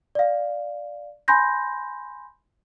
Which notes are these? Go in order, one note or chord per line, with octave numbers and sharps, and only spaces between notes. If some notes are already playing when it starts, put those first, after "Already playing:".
D5 F5
G#5 B5 C6 G6 A#6